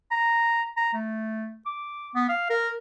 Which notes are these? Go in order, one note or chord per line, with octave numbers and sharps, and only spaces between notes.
A#5
A#5
A3
D6
B3
F5
A#4